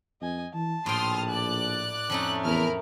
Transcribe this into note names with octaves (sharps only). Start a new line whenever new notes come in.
F2 D#5 G#5
E3 A5
A#1 A2 G5 C6 D#6 F6
D5 F#6
F2 A3 C#4 D#4 A5
E2 A#4 B5 F6